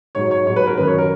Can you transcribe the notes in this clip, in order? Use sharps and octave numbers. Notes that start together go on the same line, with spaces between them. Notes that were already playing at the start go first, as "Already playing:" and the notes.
G#2 F#3 C#5
C#5
G#2 F#3 C#5
B4
A#4
F#2 D#3 F#3 B4
C#5
A#4